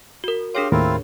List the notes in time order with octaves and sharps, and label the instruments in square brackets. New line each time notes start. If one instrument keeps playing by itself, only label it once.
[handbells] F#4 A#4
[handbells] D4 G#4 C#5 [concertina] G4 F5 C6
[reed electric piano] D#2 A2 A#4 [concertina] C4 E4 F4